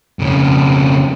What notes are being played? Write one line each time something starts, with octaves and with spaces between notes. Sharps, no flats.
F2 C#3